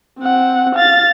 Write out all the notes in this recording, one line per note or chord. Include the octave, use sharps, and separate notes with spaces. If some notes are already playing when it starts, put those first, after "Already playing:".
C4 F#5
F5 A6